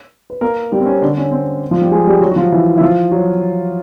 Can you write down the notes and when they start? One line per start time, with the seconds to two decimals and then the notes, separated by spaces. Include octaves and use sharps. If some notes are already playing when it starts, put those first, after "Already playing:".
0.30 B4
0.41 A#3 A#4
0.72 G3 G4
0.80 C4
0.86 C#4
1.02 D3 D4
1.17 C#4
1.31 C4
1.71 F3 F4
1.81 G3 G4
1.92 G#3 G#4
2.07 G3 G4
2.21 F#3 F#4
2.32 F#4
2.36 F3 F4
2.52 E3 E4
2.77 E4
2.81 F3 F4
3.11 F#3 F#4